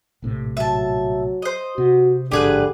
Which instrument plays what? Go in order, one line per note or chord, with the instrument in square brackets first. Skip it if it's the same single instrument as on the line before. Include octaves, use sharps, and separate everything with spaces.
[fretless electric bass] A#1 A2 C3
[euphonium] F#3 [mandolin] E5 A5
[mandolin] C5 D#5
[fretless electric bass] C3 [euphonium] F#4
[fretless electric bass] A1 F2 G#2 [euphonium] D3 [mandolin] G4 G#4 B4